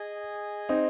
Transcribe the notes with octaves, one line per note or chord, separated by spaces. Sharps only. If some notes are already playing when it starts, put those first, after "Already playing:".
Already playing: G#4 D#5 G#5
C4 D#4